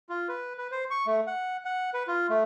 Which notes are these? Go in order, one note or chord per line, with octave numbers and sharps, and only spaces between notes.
F4
B4
B4
C5
C#6
A3
F#5
F#5
B4
F4
A3